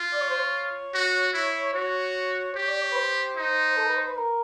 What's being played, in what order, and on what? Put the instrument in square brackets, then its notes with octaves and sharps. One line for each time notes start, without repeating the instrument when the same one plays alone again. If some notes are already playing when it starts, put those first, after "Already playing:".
Already playing: [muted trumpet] F4
[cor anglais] D5
C#5
C5
C#5
[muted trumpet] F#4
E4
[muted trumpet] F#4 [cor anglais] C#5
[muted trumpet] G4 [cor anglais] C#5
[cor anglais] D5
C#5
B4
C5
[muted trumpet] D#4
[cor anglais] A4
B4
C5
B4
A#4